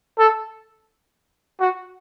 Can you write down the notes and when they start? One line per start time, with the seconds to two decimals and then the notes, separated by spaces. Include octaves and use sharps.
0.19 A4
1.60 F#4